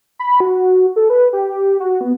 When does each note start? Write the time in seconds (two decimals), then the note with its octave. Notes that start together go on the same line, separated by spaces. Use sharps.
0.19 B5
0.40 F#4
0.96 A4
1.10 B4
1.33 G4
1.80 F#4
2.01 B3